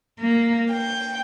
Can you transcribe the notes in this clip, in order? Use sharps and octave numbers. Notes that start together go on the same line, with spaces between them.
A#3
G5